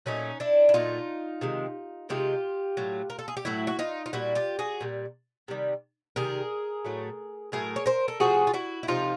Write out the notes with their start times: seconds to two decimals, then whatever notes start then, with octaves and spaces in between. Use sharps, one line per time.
0.06 A#2 F#3 A3 C#4 D#4
0.40 D4 E4
0.69 E4
0.74 A#2 F#3 A3 D#4 F4
1.41 C3 D#3 G#3
2.09 C3 D#3 G#3 F4 G4
2.77 A2 F#3 A3
3.10 A#4
3.19 A4
3.28 G#4
3.37 G4
3.45 A2 F#3 A3 E4 F#4
3.67 F#4
3.79 D#4 F4
4.06 F4
4.13 A#2 G3 E4 F#4
4.35 F4 G4
4.59 F#4 G#4
4.81 A#2 G3
5.48 C3 D#3 G3
6.16 C3 D#3 G3 G#4 A#4
6.85 A2 F#3 A3
7.52 A2 F#3 A3 G#4 A#4
7.76 C#5
7.86 A#4 C5
8.08 A4
8.20 C3 F3 A3 F#4 G#4
8.47 F4
8.54 E4 F#4
8.83 E4
8.87 C3 F3 A3 D#4 F4